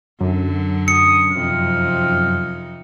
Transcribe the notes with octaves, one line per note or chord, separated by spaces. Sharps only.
F#2 D3 F#3
D#6 C#7
F2 C3 D#4 F6